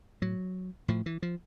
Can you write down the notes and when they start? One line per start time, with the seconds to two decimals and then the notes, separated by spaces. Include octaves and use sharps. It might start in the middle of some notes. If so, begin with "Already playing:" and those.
0.22 A2 F#3
0.88 A2 F3
1.06 E3
1.22 F3